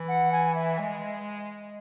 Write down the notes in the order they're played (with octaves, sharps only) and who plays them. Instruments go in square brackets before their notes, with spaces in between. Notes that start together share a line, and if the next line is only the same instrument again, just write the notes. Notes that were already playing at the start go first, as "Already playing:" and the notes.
Already playing: [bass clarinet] E3
[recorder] F#5
G#5
E5
[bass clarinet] G#3